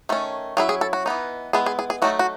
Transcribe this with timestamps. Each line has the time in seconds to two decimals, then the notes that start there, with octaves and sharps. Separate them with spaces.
0.09 D#3 A3 C#4
0.57 F#3 C#4 E4 G#4
0.69 G#4
0.81 A4
0.93 F#4
1.06 E3 B3 D#4
1.53 G#3 B3 E4 G#4
1.66 G#4
1.79 G#4
1.90 G#4
2.02 F#3 A3 D#4 F#4
2.19 F#4